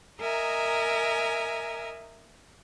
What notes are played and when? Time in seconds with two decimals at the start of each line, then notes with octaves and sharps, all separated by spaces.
0.20 A#4 D#5 E5 G#5 A#5